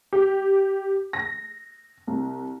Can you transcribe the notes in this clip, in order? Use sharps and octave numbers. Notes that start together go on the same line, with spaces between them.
G4
A#6
C2